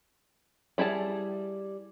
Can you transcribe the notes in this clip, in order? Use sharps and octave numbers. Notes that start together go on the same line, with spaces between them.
G3 E4 G#4 A5